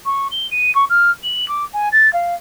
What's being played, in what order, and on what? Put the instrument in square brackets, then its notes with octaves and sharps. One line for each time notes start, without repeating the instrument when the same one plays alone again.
[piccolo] C#6
G7
D#7
C#6
F6
F#7
D6
G#5
A6
F5